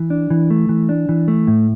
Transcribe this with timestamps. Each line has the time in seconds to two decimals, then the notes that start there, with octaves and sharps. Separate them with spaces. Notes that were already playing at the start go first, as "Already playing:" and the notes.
Already playing: E3
0.10 D4
0.30 E3
0.50 A3
0.69 E3
0.89 D4
1.09 E3
1.28 A3
1.47 A2